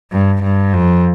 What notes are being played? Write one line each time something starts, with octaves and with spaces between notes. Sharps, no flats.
G2
G2
F2